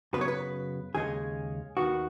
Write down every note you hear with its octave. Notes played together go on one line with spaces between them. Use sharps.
F#2 C#3 B3 B4
C#5
B4
D#2 C#3 G#3 C#4 G#4
D#2 D#3 B3 F#4